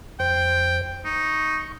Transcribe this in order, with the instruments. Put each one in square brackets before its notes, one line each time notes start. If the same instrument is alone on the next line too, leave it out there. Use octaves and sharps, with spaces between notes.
[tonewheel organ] F2 C5 [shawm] G5
[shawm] D#4 [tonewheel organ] C#6